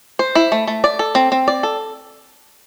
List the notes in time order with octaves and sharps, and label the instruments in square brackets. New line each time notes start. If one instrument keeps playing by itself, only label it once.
[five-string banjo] C5
E4
A3
A3
D5
A4
C4
C4
D5
A4